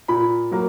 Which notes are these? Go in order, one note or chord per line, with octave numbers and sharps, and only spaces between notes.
A#2 B5
F#3 A#3